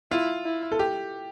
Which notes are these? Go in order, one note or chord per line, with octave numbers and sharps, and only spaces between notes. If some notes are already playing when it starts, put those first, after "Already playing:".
E4 F4
E4
A4
G4